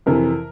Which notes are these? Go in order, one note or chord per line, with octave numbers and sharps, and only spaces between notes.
F2 C3 E3 A#4